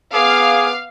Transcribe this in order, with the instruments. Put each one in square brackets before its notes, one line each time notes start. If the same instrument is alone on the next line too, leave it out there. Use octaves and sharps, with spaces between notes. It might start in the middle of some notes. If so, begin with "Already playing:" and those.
[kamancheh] B3 D6 [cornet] G#4 [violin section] F5